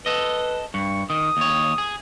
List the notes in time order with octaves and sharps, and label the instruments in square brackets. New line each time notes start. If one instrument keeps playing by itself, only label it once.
[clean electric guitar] A4 D#5 [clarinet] B4
[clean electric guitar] G2 [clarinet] C#6
[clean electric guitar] D#3 [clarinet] D#6
[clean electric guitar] D#2 C#5
G#4